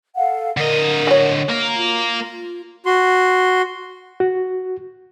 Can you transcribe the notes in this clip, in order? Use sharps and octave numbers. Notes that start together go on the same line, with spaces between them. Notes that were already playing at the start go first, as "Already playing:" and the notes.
A4 F5 F#5
D3 A#4 D#5
F#4 C#5
A#3 A#4
F4
F#4 C6
F#4